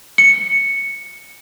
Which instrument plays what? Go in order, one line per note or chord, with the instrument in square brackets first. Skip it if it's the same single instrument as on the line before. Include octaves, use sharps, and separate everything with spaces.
[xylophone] C#7